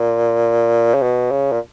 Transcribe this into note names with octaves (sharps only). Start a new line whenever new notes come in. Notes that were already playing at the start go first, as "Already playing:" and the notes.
Already playing: A#2
C#3
B2
C#3
A#2